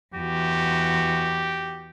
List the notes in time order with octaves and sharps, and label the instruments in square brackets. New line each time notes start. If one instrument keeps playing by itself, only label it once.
[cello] E2 F#4 [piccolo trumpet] G4